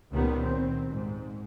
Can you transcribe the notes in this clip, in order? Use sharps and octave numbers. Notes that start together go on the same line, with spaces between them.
C#2 A#2 D#3 G3 B3
C4
G#2